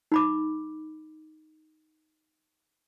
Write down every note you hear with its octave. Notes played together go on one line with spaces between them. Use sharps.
D#4 B5 D6